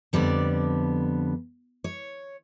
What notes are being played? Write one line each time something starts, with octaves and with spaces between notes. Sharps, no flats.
F2 D3 G3 B3 D5
C#5